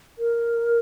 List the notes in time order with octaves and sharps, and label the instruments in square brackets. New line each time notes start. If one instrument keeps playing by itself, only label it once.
[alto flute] A#4